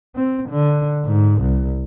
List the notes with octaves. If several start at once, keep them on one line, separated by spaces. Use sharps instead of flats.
C4
D3
G#2
C2